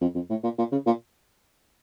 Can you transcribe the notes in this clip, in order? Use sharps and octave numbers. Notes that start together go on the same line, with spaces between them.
F2
F2
A2
A#2
A#2
C#3
A#2